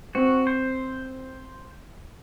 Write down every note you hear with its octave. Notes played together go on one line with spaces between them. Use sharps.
C4 F#4
C5